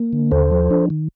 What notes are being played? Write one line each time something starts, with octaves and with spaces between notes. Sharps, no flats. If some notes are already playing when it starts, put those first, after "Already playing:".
Already playing: A#3
D3
D#2 A4 C5
F3
D4
D#3